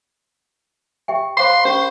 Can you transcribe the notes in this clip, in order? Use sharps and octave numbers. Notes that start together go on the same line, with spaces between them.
G4 E5 G5
C5 F5 C6 D6
C#4 G4 C5